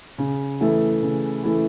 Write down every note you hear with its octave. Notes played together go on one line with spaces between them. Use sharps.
C#3
E3 A3 E4 A4
C#3
E3 A3 E4 A4